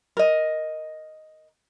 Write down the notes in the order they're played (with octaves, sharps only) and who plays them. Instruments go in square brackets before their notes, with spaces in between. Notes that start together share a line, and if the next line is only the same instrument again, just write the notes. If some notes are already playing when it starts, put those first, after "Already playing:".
[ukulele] A#4 D#5